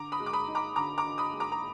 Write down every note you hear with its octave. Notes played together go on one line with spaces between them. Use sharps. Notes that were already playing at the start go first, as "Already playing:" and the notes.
Already playing: D3 A#5 D6
B5 D#6
G#3
D6
B5 D#6
D#4
A#5 D6
D3 A#5 D6
A#5 D6
D3
B5 D#6
G#3
A#5 D6
A#5